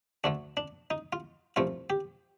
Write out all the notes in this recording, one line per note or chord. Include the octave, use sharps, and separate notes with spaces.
D2 D3 A3 D4
D4
D#4
F4
C2 A#2 F3 A3 F4
G4